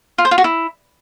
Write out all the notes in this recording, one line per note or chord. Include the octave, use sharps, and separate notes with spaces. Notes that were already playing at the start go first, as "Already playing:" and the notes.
F4
C5
F4
F#4
E4